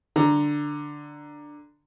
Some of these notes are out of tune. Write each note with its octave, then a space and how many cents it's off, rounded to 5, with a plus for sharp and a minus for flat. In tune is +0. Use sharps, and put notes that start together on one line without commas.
D3 +5 A#5 +0